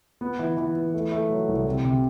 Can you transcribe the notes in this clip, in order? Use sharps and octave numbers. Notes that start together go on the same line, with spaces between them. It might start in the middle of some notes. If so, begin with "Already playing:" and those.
B3
E3
E3
E3
A3
A3
F#3
C2
C3
C3